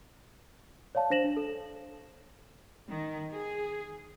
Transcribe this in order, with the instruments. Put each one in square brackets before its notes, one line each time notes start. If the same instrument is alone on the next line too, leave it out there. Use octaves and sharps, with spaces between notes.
[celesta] C#5 D5 F5 A5
D4 C5 A#6 E7 F#7
D4
A4
[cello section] D#3
G#4